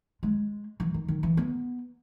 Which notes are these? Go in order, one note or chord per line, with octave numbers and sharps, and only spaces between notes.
G#3
E3
D#3
D#3
E3
B3